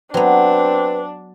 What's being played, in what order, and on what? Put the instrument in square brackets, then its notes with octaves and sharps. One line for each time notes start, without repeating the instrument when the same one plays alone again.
[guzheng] F#3 B3 [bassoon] C4 [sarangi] D4 [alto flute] B4